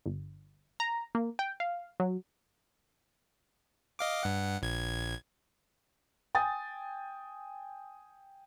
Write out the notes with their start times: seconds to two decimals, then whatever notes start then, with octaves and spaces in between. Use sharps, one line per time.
0.06 G1
0.80 A#5
1.15 A#3
1.39 G5
1.60 F5
2.00 F#3
3.99 D#5 F5 D6
4.23 G2 F#5
4.62 A#1 G#6
6.35 G5 G#5 D#6 A6